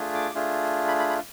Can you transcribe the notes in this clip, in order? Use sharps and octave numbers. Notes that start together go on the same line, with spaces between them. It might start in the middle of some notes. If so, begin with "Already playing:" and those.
Already playing: A3 D4 F4 G#4
D6
A3 D4 F4 G#4
B5
B5
B5